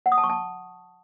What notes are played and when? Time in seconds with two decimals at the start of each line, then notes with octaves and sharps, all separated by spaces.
0.06 F#5
0.12 D#6
0.18 A5
0.24 C#6
0.30 A5